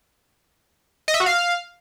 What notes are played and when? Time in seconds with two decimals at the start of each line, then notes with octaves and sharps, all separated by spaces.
1.08 D#5
1.14 E5
1.20 F#4
1.26 F5